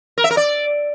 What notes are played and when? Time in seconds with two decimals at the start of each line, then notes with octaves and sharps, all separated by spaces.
0.18 A#4
0.24 E5
0.31 A#4
0.37 D5